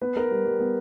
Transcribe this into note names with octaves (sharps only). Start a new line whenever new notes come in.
B3 B4
B3 A#4
G3
G3
B3